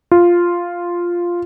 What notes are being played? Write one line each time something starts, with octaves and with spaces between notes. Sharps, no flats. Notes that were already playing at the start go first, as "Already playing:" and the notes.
F4